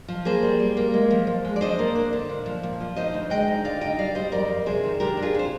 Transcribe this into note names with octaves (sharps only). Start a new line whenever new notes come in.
F3
A#3 G#4 C5
G3
G3
A#3
G#3
F3
F3
G#3
D5
D4 C5 D#5
A#3
D4
D3
A#2
F3
A#2
F3
D#4 C5 D#5
D2
G#3 D#5 G5
D#4
D3 D5 F5
D#4 D#5 G5
G3 D5 F5
G3 C5 D#5
F2 A#4 D5
F2
C3 G#4 C5
D#3
D4 G4 A#4
D4
F4 G#4
C3 C5